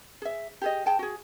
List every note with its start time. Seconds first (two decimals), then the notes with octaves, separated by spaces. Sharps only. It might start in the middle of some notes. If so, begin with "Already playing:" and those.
0.22 G#4 E5
0.62 G4 G#4 D#5
0.86 G#4 G5 A5
0.99 F#4 G#4